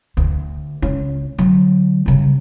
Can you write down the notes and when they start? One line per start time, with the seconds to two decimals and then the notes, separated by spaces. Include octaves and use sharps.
0.17 D2
0.82 C#2 C#4
1.38 D3 F#3
2.06 C#3 G3